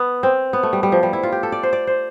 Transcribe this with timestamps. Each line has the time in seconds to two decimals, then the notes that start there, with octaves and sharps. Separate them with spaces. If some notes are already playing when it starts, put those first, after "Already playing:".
Already playing: B3
0.23 C4
0.53 B3
0.63 A3
0.73 G3
0.83 G3
0.92 F3
1.03 G3
1.13 E4
1.23 F4
1.32 G4
1.43 A4
1.52 D5
1.63 C5
1.73 D5
1.87 C5